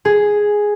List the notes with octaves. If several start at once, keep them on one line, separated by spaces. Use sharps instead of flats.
G#4